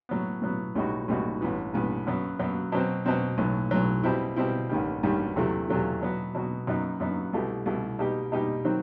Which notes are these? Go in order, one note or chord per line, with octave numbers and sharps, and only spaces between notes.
A2 F#3 B3
A2 F#3 B3
B1 A2 G3 D#4 F#4
B1 A2 G3 D#4 F#4
A1 G2 E3 B3
A1 G2 E3 B3
F#2 F#3 B3
F#2 F#3 B3
B2 F#3 C4
B2 F#3 C4
B1 A2 F#3
B1 A2 F#3
B2 G3 C4 E4
B2 G3 C4 E4
A1 G2 D#3 G3
A1 G2 D#3 G3
E2 C3 F#3 A3 E4
E2 C3 F#3 A3 E4
B2 F#3 B3 F#4
B2 F#3 B3 F#4
F#2 F#3 B3 D#4
F#2 F#3 B3 D#4
C2 B2 A3 E4 G4
C2 B2 A3 E4 G4
B2 G3 D#4 G4
B2 G3 D#4 G4
D#3 F#3 C4 D#4